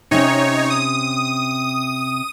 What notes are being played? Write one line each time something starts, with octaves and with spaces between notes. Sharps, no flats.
C3 C#4 D#4 C#5
D#6